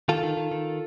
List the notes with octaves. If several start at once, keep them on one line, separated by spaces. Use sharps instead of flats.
D#3 F4 A4
D#3
D#3
D#3